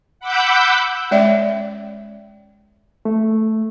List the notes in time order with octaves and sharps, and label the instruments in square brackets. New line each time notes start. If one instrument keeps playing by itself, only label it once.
[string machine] F#5 B5 D6 E6 F#6 G6
[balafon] G#3 C#4 C#5 D5 E5
[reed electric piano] A3